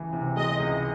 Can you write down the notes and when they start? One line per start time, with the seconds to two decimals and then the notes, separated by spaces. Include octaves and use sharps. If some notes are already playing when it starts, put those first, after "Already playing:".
Already playing: C#2 E3 G#3
0.13 C3
0.36 G#3 D#5
0.60 C#2